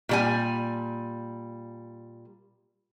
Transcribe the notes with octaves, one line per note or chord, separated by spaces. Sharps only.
A#2 G3 G#5